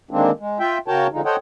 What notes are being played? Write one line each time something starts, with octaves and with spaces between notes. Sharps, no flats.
D3 D#3 G#3 A#3 C4 D4
G#3
F4 E5 G5
C#3 F#4 A#4 C#5 G5 A5
D3 F3 G#3 D#4
A4 C5 C#5 D#5 F#5 G5